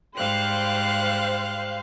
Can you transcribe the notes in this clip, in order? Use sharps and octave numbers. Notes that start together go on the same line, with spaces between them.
G#2 G3 C5 F5 F#6